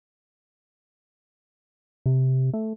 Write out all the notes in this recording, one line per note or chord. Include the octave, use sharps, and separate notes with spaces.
C3
A3